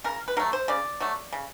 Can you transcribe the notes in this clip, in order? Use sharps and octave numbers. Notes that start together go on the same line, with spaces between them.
C#3 A#4
B4
F#3 A3 A#4
C5
C#3 D5
F#3 A3
C#3